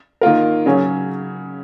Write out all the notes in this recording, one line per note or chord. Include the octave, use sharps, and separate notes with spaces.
D#3 A#3 F4 A#4
C#3 F#3 C#4 G#4 C#5